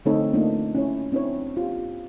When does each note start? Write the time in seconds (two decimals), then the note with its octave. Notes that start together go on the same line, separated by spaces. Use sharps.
0.05 D3 A3 C4 D#4 A4 C#5
0.33 A3 A#3 D4 D#4 F4
0.75 C#4 E4 C#5
1.12 C4 D4 E4 B4 C#5
1.57 F4 G4